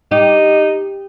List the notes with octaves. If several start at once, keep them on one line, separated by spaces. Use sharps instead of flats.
D#4 G4